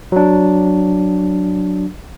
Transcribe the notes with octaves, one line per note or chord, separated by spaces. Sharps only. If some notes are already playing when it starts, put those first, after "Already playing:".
F#3 D4